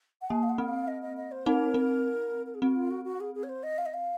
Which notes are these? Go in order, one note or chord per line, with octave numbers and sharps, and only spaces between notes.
F#5
A#3 G#5
F5
F#5
C4
F5
D#5
D#5
D#5
C5
C4 D#4 A#4
C4
A#4
G#4
C4 F#4
F4
F#4
F#4
G#4
G#4
C#5
C5
D#5
F5
D#5
F5